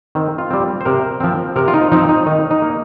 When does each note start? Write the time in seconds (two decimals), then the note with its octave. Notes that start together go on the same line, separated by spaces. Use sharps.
0.15 D#3 C4
0.38 F4
0.51 G3 C4
0.81 C5
0.85 C3 A#4
1.20 F3 C4
1.56 C3 A#4
1.68 F4
1.74 D#4
1.92 F3 C4 D#4
2.09 D#4
2.26 D#3 D#4
2.51 D#4
2.62 A#3